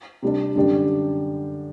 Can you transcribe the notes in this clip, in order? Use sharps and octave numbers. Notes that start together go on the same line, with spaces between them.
C3 G3 D4
F#2 D3 G3 D4 G4